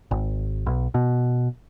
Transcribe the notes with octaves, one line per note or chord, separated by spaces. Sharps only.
G#1
B1
B2